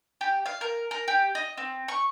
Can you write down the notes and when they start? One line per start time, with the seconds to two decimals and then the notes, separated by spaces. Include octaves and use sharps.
0.21 G4
0.46 F5
0.61 A#4
0.91 A#4
1.08 G4
1.35 D#5
1.57 C4
1.88 C#6